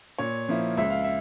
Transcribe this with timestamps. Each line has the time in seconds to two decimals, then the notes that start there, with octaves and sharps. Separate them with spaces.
0.18 A#2 C#5
0.49 F3 A#3 E4
0.77 C#2 E5
0.90 F5
1.04 E5